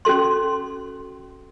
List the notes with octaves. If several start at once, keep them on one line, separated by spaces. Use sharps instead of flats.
C#4 F#4 A4 C6